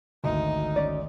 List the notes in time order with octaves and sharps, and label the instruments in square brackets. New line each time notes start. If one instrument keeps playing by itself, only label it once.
[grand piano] G#1 D2 [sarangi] D#4
[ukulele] C#4 D5